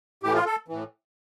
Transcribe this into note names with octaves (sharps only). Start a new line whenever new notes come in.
A2 E3 G4
F4
A4
A2 E3